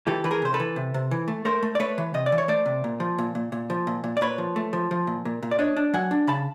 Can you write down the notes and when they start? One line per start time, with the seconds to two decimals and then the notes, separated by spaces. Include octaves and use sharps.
0.07 E3 G4 A4
0.24 E3 B4
0.31 G#4 A#4
0.42 C3 C5
0.54 A4 B4
0.60 E3
0.76 C3
0.94 C3
1.11 E3
1.28 A3
1.45 A3 A#4 C5
1.63 A3
1.75 D5
1.80 A3 B4 C#5
1.98 E3
2.14 C3 D#5
2.26 D5
2.32 E3
2.38 C#5
2.48 A3 C5 D5
2.66 C3
2.84 A#2
3.00 F3
3.18 A#2
3.35 A#2
3.52 A#2
3.70 F3
3.87 A#2
4.04 A#2
4.17 D5
4.21 A#2 B4 C#5
4.38 F3
4.56 A3
4.73 F3
4.91 F3
5.07 A#2
5.25 A#2
5.43 A#2
5.51 D5
5.59 D4 C#5 D#5
5.76 D4
5.94 F#3 F#5 G#5
6.11 D4
6.27 C#3 A5 B5